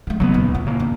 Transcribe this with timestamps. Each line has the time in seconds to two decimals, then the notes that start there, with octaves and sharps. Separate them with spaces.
0.07 D3 G#3
0.20 C#3 F#3 G#3 A#3 B3
0.34 D#1 C#2
0.55 F4
0.67 C#3 A#3
0.80 D3